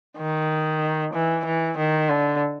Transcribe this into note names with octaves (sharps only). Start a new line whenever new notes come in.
D#3
E3
E3
D#3
D3